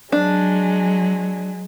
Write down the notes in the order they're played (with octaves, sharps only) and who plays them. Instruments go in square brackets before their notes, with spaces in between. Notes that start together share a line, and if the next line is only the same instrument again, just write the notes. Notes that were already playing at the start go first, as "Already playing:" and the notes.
[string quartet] F#3 G#3 [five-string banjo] D4